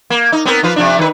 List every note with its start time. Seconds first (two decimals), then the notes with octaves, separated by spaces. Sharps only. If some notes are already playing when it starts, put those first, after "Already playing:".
0.10 A#3
0.32 D#4
0.45 B3 C4 A#4
0.63 F3 F4 B4
0.76 C3 F3 D4
0.98 D#3 B4